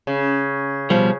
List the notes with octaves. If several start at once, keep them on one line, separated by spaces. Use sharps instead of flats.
C#3
B2 F3 G3